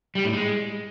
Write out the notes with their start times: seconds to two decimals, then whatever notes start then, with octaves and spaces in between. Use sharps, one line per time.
0.15 G3
0.24 A2
0.33 G#3